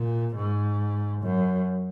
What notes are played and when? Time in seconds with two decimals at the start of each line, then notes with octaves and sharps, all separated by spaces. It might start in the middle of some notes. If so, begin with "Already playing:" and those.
Already playing: A#2
0.36 G#2
1.21 F#2